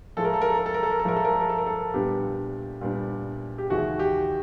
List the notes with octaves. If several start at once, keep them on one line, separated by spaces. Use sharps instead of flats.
A2 F3 G#3 A4
A#4
A4
A#4
A4
A#4
A4
A#4
A4
A#4
A4
A2 F3 G#3 A#4
A4
A#4
A4
A#4
A4
A#4
A4
A#2 G3 B3 D4 G4
A#2 G3 B3 D4
G4
D#2 C#3 E3 G#3 C#4 F#4
G4